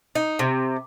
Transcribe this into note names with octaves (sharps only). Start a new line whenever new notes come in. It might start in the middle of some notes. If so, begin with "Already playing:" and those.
D#4
C3